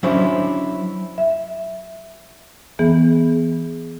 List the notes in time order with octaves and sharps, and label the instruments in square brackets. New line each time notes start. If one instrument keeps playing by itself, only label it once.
[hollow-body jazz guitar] F#3 C#4 D4 E4 C5
[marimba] E5
E3 B3 G#4